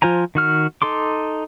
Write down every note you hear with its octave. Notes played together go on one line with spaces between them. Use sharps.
F3 F4 C5 G#5 A#5
D#3 F#4 F6
D#4 A4 C6 D6